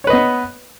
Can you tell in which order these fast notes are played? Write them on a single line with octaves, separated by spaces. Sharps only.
C#5 B4 D#5 B3